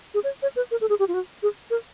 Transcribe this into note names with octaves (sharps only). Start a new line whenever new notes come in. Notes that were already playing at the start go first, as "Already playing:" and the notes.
G#4
C#5
C#5
B4
A#4
A4
G#4
G4
F4
F#4
G#4
A#4